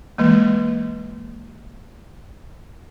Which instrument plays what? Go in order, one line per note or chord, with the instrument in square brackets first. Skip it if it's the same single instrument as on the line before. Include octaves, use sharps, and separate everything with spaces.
[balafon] E3 G#3 A#3